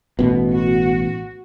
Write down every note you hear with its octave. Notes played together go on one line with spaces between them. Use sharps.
A1 B2
F#4